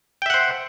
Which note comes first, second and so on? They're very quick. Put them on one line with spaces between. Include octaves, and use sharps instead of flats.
G5 E5 F#5 C5